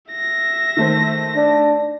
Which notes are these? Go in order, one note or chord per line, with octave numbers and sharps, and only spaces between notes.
E5 A#6
D#3 A3 C5
D4